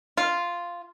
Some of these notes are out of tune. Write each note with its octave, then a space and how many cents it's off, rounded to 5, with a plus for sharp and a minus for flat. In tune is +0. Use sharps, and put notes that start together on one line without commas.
F4 -5